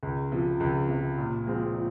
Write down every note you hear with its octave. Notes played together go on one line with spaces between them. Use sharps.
C#2
C3 F3
C#2
C3 F3
A#2
F3 G#3 C4 F4
A#2